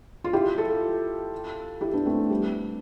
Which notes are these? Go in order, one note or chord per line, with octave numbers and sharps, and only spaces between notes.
F4
E4 G4
F4 A4
E4 G4
B3 D4
A3 C4
G3 B3